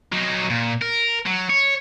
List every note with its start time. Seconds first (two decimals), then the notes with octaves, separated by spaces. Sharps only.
0.12 F#3 D#4
0.50 A#2
0.82 A#4
1.26 F#3
1.50 C#5